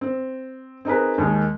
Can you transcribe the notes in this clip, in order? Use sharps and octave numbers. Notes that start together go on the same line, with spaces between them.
C4
C4 D#4 G#4 A#4 B4
D#2 D#3 G#3